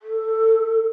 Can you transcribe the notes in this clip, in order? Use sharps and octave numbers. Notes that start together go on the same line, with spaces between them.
A4